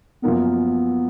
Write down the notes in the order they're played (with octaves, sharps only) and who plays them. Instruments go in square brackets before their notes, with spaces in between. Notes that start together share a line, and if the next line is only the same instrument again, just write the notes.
[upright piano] F#2 F3 A#3 F4 A#4 [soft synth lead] B3